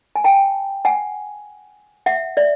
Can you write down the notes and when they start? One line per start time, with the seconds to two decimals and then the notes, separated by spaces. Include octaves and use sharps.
0.16 G#5
0.24 G5 A5
0.85 F#5 G#5
2.06 E5 F#5
2.37 D5 E5